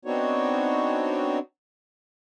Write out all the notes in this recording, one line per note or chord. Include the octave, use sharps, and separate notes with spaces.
B3 C4 D4 D#4 F#4 C#5